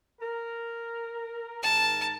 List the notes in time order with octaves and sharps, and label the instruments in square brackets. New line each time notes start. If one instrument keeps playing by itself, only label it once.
[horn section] A#4
[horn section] G#2 D#3 A#4 [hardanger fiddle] A5